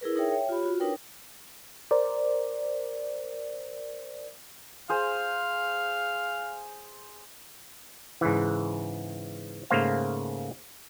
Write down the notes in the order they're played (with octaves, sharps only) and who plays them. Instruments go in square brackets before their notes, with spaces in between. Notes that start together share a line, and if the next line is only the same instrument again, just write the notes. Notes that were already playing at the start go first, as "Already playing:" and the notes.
[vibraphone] E4 G#4 A#4 B4
D#4 G#4 A#4 C#5 E5 G5
C#5 E5 G5
F4 G4 C#5 B5
F4 F#4
D4 D#4 A#4 B4 C#5 G5
[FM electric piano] A#4 C5 D5
[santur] G#4 C5 [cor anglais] F5
[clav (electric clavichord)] G#2 C#3 E3
G#2 C#3 A3 A#3 C5 F5